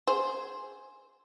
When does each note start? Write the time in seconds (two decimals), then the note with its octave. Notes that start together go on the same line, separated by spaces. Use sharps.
0.07 G#4 C5